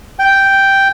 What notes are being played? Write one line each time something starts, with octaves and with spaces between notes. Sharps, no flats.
G5